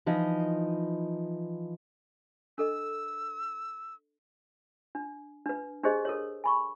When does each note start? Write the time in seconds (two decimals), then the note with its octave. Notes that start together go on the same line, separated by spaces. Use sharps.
0.06 E3 F3 D#4 D#5
2.58 D4 A4 D#5 E6
4.95 D4
5.46 D4 B4
5.84 D4 G4 G#4 C5 D#5
6.05 A4 A#4 C#5
6.44 G#5 B5 C#6